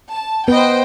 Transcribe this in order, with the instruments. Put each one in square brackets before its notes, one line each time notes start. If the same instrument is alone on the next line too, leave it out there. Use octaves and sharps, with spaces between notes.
[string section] A5
[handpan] B3 B4 [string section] C5 D#5 G5